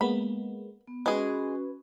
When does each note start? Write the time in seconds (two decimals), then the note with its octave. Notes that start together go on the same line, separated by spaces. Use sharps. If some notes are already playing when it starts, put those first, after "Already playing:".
0.01 G#3 A#3 B3 B5
0.87 B3
1.06 G#3 C#4 F#4 G#4 B4